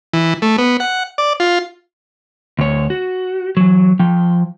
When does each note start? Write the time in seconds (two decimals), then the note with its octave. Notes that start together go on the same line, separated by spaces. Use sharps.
0.13 E3
0.42 A3
0.58 B3
0.80 F#5
1.18 D5
1.40 F4
2.59 D2 C#5
2.90 F#4
3.57 E3 F#3
3.99 F3 G5